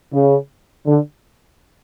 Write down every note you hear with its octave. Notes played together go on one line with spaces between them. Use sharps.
C#3
D3